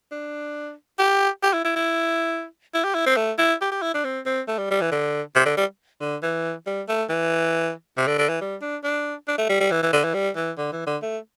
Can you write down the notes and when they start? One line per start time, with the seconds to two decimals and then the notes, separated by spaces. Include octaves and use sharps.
0.12 D4
0.99 G4
1.43 G4
1.53 E4
1.64 E4
1.76 E4
2.74 E4
2.84 G4
2.95 E4
3.06 C4
3.16 A3
3.38 E4
3.61 G4
3.71 G4
3.82 E4
3.94 D4
4.04 C4
4.25 C4
4.47 A3
4.58 G3
4.70 G3
4.81 E3
4.91 D3
5.35 C3
5.45 D3
5.57 G3
6.01 D3
6.22 E3
6.66 G3
6.88 A3
7.09 E3
7.97 C3
8.07 D3
8.18 D3
8.29 E3
8.41 G3
8.61 D4
8.84 D4
9.28 D4
9.38 A3
9.49 G3
9.60 G3
9.71 E3
9.82 E3
9.93 D3
10.04 E3
10.14 G3
10.36 E3
10.58 D3
10.72 E3
10.87 D3
11.02 A3